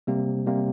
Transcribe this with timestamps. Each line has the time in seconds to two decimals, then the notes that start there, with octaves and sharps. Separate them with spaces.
0.07 C3 G3 A#3
0.47 C3 G3 A#3